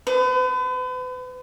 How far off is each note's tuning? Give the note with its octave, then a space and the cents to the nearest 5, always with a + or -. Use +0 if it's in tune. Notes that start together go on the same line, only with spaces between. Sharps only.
B4 +40